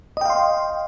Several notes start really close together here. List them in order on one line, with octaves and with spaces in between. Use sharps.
D#5 G5 F5 C6